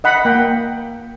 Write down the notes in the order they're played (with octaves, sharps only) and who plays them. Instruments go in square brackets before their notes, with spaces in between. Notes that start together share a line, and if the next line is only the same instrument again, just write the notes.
[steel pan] D#5 F#5 B5
A#3 G5